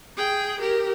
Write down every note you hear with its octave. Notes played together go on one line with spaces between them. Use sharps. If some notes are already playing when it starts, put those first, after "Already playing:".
G#4 G5
G4 A#4